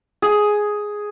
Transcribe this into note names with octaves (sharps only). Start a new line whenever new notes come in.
G#4